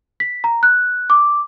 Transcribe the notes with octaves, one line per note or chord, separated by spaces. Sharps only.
B6
A#5
F#6
D6